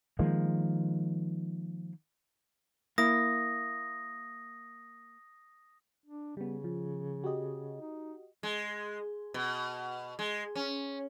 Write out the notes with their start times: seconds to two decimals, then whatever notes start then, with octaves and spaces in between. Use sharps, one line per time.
0.19 D#3 F3 G#3 A#3
2.98 A#3 E4 D#6 A#6
6.06 D4
6.37 C#3 G3 B3
6.64 F3
7.24 F#4 G4 D#5
7.81 D#4
8.43 G#3
9.34 B2
10.19 G#3
10.55 C#4